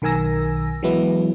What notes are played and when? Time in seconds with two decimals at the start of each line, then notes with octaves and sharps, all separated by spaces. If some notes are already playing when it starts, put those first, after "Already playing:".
0.02 B1 D#3 A#4 G#5 E6 A#6
0.83 E3 F#3 G#3 B3 E4